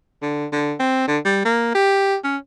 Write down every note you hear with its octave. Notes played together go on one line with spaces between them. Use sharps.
D3
D3
C4
D3
G3
A#3
G4
C#4